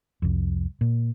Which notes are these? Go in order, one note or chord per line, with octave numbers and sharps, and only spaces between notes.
C2 F2
A#2